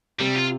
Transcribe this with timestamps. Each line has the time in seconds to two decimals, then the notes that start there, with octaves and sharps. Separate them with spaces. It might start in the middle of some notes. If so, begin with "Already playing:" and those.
0.20 C3 G3
0.35 F4